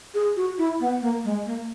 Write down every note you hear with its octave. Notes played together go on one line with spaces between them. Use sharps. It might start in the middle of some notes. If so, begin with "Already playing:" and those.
G#4
F#4
E4
B3
A#3
G#3
A#3